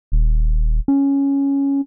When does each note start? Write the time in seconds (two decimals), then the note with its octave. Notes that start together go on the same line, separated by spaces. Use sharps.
0.12 D#1
0.88 C#4